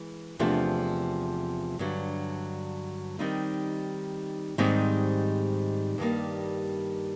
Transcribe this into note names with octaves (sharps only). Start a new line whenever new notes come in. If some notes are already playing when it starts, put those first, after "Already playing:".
Already playing: E3 G#3
E2 C3 F3 A3 D4
G2 D3 F#3
D#3 G3 C4 D#4
G#2 D#3 G3 C4 D#4
G2 D#3 G3 A#3